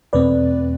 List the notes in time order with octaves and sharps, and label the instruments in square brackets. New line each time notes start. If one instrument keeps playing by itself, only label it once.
[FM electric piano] E2 B2 A3 C4 B4 D5